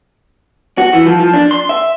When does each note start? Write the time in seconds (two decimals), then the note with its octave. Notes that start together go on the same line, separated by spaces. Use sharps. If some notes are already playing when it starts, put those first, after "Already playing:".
0.78 F#4
0.93 E3
1.06 F3
1.20 F3
1.33 D4
1.51 C6
1.69 E5